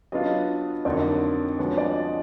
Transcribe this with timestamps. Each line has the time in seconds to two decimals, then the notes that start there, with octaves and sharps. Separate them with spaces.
0.12 F#3 B3 D4 F4 D#5
0.85 F2 D3 F#3 A#3 D#4 D5
1.59 F3 G#3 B3 D4 F#4 C#5
1.78 D5
1.95 D#5